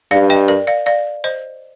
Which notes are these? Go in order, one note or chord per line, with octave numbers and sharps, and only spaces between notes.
G2 D5 F5
D#5 G5
A#4 D5
D5 F5
D5 F5
C5 D#5